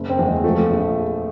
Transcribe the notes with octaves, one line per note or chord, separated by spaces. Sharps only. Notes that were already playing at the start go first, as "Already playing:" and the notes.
Already playing: F#1
C4
E2
G#3
F3 A3
A#1